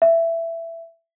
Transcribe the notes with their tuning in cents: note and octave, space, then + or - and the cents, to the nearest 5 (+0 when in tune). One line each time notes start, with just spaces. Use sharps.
E5 +15